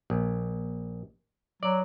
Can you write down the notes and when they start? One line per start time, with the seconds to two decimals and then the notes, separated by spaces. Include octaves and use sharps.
0.10 A#1
1.63 F#3 D5